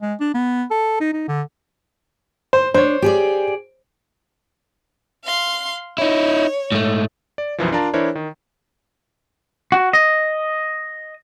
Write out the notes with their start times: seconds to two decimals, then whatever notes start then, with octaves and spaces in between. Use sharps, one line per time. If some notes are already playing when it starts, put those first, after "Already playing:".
0.01 G#3
0.20 D4
0.34 B3
0.71 A4
1.00 D#4
1.13 D#4
1.28 D3
2.53 C5
2.74 D4 C5 C#5
3.02 G4 G#4 D5
5.24 F5 C6
5.98 D#4 E4 C#5
6.72 G#2 A3
7.38 D5
7.58 B1 F#2 E3 F3
7.72 D4 F4 A#4 D5 A5 A#5
7.94 E3 D4 E4 A#4 C5 C#5
8.15 D#3
9.72 F#4
9.93 D#5